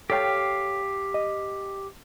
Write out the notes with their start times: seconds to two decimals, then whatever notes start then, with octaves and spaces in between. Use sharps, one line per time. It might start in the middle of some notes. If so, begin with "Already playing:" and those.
0.10 G4 A4 C#5 F5 G5
1.14 D#5